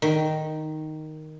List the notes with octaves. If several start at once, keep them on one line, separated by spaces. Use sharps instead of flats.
D#3